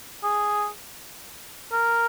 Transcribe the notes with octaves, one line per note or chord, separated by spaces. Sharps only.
G#4
A#4